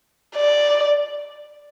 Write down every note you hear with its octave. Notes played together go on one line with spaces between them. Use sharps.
D5